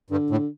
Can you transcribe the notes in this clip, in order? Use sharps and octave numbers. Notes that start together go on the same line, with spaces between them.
G2 D3
A2